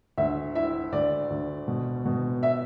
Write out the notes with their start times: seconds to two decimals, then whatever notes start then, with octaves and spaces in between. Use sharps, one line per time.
0.18 D2 E5
0.55 E4 E5
0.92 D2 D5
1.30 D2
1.68 B2
2.05 B2
2.43 E5